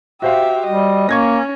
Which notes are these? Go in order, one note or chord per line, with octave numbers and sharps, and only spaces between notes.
F#4 G4 C5 E5 F5
G3 D#5
A#3 C#4 C#6 G#6 A#6